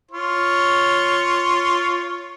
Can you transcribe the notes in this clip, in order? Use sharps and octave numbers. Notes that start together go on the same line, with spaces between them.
F4 C#5